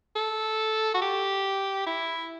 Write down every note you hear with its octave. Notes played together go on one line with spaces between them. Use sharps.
A4
F#4
G4
E4